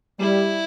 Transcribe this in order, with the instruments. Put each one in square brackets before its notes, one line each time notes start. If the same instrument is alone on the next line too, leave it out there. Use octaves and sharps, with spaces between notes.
[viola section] G3 [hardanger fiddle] E4